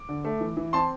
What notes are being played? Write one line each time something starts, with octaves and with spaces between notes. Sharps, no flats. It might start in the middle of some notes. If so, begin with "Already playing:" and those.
Already playing: D6
D3
A3
E3
E3
C4 A5 C6